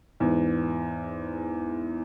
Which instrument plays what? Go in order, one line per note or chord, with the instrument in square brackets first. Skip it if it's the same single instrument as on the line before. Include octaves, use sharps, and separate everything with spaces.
[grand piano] E2 G#2